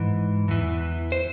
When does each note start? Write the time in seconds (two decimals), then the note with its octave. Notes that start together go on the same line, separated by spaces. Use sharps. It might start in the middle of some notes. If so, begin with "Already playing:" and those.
Already playing: G#2 E3
0.48 E2 E3
1.12 C5